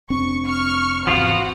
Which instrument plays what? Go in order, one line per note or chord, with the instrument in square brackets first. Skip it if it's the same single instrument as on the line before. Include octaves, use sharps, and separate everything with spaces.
[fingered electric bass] F1 C4 D4 [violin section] C#6
[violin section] C#6 F6
[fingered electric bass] G#1 E2 C3 [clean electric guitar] F3 B3 F4 [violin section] F#4 F#5